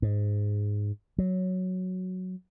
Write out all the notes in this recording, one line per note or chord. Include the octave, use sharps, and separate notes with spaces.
G#2
F#3